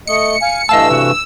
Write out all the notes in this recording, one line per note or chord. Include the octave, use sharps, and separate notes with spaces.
A3 D#5 C#7
F5 G#5
G2 E3 A3 D#5 F5 A5 E6
C3 F#4